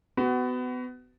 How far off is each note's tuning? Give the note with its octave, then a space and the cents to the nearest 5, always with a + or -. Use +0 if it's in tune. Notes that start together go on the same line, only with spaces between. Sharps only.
B3 +25 F#4 +25